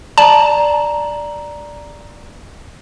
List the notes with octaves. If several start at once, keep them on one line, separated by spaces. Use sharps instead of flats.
D5 A5 A#5 F#7